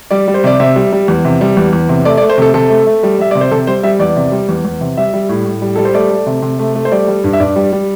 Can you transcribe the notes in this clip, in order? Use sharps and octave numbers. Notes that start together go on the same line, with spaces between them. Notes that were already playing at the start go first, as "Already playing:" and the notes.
G3 D5
G3
C5
C3 D5
C3 E5
G3
G3
E2
C3
G3
E2
E2
C3
A3 D5
D5
A3
C5
C3 A4
C3 A4
A3
A3
G3
G3 E5
C3 D5
C5
C3 A4
G3 C5
G3 E5
E2 D5
C3
G3
E2
E2
C3
G3 E5
G3
A2
A2
G3
G3 A4
C5
A3 D5
A3
C3
C3
A3
A3
C5
G3 D5
G3
G2
E5
G2 D5
G3
G3